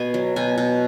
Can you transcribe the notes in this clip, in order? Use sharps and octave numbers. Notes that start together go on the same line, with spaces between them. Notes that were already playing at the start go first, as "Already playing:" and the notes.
Already playing: B2 B3 G#5
F#3
B2 G#5
B2